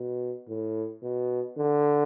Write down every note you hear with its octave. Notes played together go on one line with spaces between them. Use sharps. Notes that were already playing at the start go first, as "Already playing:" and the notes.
Already playing: B2
A2
B2
D3